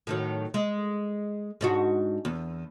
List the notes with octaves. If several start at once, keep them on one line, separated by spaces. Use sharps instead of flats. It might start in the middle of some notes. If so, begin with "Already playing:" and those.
A2 D#3 F#3
G#3
G#2 D4 F#4
E2